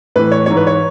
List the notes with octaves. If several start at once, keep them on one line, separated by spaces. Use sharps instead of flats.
A2 E3 B4
C#5
G#2 E3 C#5
B4
C#5